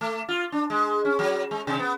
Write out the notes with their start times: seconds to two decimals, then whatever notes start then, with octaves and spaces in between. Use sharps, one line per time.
0.01 A3
0.29 F4
0.52 D4
0.70 G#3
1.05 C#4
1.19 F#3
1.51 G#3
1.67 C3
1.79 B3